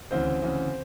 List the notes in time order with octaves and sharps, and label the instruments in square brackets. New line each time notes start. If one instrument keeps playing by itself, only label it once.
[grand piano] D2 C#3 E3 C4 C5
D2 C#3 E3